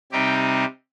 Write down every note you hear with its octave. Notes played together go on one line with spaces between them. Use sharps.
C3 G3 C4 D#4 G4 G5